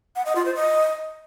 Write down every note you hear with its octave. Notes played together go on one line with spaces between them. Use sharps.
F#5
D#5
F4
C5
D#5